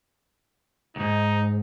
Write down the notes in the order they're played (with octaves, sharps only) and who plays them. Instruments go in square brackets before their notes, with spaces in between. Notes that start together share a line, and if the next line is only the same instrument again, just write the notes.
[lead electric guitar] C#2 G#2 [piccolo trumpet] D#4